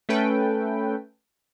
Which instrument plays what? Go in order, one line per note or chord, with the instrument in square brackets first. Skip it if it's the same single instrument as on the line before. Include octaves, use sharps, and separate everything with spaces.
[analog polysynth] A3 C#4 A4 B4 G5